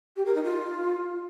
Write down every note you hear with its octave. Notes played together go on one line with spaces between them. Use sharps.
G4
A#4
D#4
F4